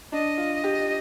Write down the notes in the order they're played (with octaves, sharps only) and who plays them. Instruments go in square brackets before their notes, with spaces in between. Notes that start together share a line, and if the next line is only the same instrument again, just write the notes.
[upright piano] D4 [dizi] D#5
[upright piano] F4
G4